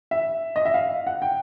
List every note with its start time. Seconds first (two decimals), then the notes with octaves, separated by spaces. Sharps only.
0.11 E5
0.56 D#5
0.65 E5
0.74 F5
1.07 F#5
1.22 G5